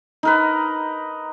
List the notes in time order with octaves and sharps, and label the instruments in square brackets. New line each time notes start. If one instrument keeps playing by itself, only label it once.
[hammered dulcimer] D#4 A#4 B4